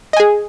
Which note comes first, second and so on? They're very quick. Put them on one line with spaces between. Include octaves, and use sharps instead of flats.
D#5 G#5 G#4